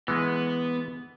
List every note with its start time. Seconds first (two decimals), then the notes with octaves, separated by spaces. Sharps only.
0.08 E3 G#3 B3